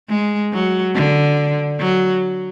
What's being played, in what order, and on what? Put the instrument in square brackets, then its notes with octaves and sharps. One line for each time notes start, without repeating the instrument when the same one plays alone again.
[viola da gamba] G#3
F#3
D3
F#3